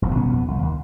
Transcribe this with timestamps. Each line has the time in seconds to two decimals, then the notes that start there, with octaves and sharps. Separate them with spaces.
0.02 E1 B1 C3
0.14 G1 B2 B3 C#4
0.33 F2 B3
0.48 C2
0.62 D#2